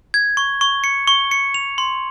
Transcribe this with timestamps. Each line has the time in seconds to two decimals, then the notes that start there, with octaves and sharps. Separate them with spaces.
0.14 G#6
0.37 C#6
0.61 C#6
0.84 C#7
1.08 C#6
1.31 C#7
1.54 F7
1.78 C6